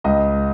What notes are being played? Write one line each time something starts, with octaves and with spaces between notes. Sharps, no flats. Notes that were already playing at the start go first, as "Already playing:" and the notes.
C#2 D#5